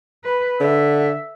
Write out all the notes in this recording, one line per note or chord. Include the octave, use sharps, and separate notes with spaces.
B4
D3 E5